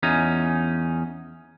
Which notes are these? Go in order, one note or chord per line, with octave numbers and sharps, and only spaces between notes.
E2 C#4 D#4